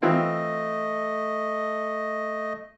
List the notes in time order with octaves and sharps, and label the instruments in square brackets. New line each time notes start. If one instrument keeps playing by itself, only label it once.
[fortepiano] E3 C4 F4 [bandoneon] A3 D#5